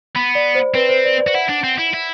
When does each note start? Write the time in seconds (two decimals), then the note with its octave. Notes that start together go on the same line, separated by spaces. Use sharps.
0.15 B3 B5
0.35 D5
0.55 C5
0.74 C4 B4
0.89 C5
1.05 D5
1.20 D5
1.27 F#4
1.34 E4 F#5
1.49 D4
1.64 C4
1.78 E4
1.93 E4